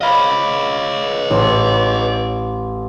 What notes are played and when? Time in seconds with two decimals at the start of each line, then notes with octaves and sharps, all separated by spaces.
0.01 C#5 D#5 F5 B5
1.30 A1